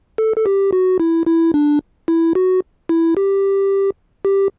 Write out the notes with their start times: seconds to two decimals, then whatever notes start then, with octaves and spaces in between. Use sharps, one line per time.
0.18 A4
0.37 A4
0.46 G4
0.73 F#4
1.00 E4
1.27 E4
1.54 D4
2.08 E4
2.35 F#4
2.89 E4
3.17 G4
4.25 G4